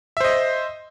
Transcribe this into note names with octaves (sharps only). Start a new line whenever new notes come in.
C5 D#5 E5